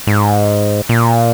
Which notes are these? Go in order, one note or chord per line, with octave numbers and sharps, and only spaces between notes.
G#2
A#2